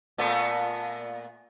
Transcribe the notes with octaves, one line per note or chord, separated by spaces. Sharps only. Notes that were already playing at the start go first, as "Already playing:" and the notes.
A#2 A3 B3